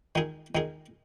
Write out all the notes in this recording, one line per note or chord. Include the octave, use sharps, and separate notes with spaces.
D#3 G#3 D#4 G#4
D#3 G#3 D#4 G#4